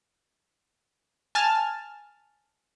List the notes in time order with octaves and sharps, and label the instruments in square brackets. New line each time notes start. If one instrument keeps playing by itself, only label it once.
[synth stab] G#5 A5 F6